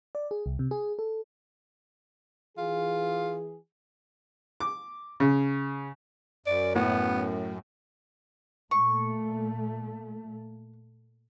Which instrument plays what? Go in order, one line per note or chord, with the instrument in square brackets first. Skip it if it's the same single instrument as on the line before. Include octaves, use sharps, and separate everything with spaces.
[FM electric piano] D5
G#4
C2
C3
G#4
A4
[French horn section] E3 G#4 [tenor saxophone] F4
[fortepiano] D6
C#3
[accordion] F#2 [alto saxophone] D5
[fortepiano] A2 [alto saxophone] B3
[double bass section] A#2 A3 [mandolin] C#6